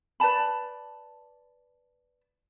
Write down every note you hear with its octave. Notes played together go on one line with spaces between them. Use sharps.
B4 D5 A5 B5